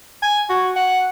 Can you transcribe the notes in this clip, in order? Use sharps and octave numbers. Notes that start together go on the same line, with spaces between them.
G#5
F#4
F#5